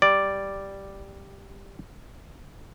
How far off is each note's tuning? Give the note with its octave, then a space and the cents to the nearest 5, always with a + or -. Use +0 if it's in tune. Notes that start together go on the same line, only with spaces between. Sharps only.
G3 +0 D5 +0